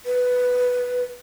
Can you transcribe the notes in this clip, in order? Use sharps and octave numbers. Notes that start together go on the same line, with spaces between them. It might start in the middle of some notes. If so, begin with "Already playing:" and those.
B4